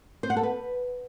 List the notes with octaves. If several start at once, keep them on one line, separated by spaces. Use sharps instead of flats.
C5
F#5
A4
B4